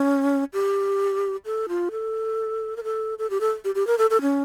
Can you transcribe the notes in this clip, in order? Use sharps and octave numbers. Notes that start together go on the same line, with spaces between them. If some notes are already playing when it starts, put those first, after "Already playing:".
Already playing: C#4
G4
A4
F4
A4
A#4
A4
A4
G4
A4
G4
G4
A#4
A4
A4
C#4